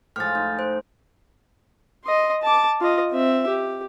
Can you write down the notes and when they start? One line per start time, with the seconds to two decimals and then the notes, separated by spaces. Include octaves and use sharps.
0.16 A2 F3 G#3 F6 A6
0.35 D#4
0.59 C5
2.05 D#5 C6
2.42 A5 D6
2.81 F4 D#5
3.12 C4 E5
3.47 G4